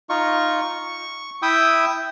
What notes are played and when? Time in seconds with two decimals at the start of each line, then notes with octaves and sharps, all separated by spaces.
0.10 D#4 F4 C#6
0.62 C#6
1.42 E4 E5 G5 D#6